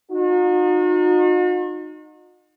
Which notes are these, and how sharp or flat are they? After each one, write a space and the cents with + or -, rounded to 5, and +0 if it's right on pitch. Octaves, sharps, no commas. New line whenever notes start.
D#4 -20 F#4 -45